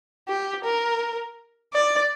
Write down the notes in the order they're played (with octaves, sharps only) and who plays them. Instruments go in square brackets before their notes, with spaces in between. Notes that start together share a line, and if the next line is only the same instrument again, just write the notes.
[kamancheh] G4
A#4
D5